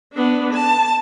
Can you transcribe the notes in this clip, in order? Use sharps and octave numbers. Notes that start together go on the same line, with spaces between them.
B3 D4
A5